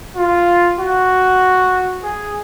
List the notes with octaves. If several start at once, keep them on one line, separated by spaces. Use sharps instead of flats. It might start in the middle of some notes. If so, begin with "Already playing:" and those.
F4
F#4
G#4